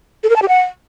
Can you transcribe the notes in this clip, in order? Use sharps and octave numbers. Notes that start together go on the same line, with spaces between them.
A4
A#4
A5
G4
F#5